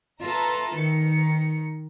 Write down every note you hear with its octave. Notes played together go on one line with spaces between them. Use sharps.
F4 A4 B4 E5 A#5
D#3 C#7